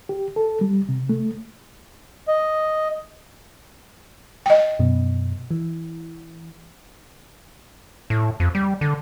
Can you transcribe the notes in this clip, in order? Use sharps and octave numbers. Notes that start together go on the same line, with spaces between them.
G4
A4
G3
C3
A3
D#5
D#5 G5
F#2 B2
E3
A2
F2
G3
D3